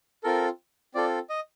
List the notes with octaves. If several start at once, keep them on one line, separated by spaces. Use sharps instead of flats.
C4 F4 A4 A#4
C4 F4 A4 D5
D#5